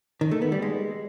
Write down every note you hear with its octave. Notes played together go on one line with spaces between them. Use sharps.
D#3
A3
B3
G3
G#3